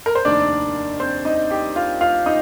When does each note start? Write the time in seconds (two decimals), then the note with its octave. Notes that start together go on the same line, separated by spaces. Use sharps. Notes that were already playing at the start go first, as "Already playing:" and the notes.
0.06 A#4
0.15 C5
0.25 F1 D#2 D#3 D4 D5
1.00 C4 C5
1.25 D#4 D#5
1.51 G4 G5
1.76 F4 F5
2.01 F4 F5
2.26 D#4 D#5